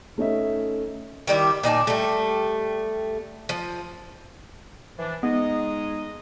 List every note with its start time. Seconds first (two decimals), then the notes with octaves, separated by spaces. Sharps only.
0.18 A3 C#4 D#4 E5
1.27 D#3 G3 E4 G4
1.63 A#2 D#4 D5 A5
1.87 G3 A3
3.49 F3
4.99 E3 F3 D4
5.23 G#3 B3 D#4 D#5